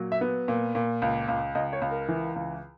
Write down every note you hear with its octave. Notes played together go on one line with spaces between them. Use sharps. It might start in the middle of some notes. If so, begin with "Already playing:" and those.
Already playing: A#2 F#3
E5
B3
A#2
A#2
C#2
C#2
C#2 D#5
C#5
C#2
A#4
E3
C#2